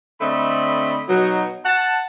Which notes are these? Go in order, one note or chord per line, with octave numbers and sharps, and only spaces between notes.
D3 A3 C4 D#5 B5
B2 F#3 D#4
F#5 A5